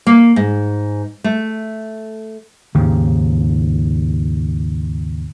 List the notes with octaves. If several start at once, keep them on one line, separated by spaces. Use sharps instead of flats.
A#3
G#2
A3
D#2 G#2 C#3